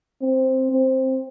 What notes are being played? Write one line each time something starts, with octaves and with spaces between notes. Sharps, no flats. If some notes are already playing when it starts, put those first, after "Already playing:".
C4
C4